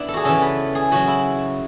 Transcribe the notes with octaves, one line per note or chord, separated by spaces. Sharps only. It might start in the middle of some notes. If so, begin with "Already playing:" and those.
Already playing: B3 D4 E4
A4
F#4 G#4
C#3 E3 A4
B4
G#4
C#3 F#3 F#4
E4